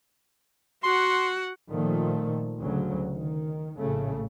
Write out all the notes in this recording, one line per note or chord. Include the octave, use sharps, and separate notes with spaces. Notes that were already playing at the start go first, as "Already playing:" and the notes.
F#4 F#5 C6
A#2 D#3 F3 A3
D2 C#3 F#3
D#3
A#1 A2 C#3 A3